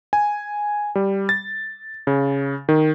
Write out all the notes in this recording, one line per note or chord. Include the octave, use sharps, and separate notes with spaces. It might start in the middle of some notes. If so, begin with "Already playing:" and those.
G#5
G3
A6
C#3
D#3